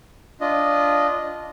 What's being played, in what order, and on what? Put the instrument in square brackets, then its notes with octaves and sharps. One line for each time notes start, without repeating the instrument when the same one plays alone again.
[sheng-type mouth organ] D4 F4 D#5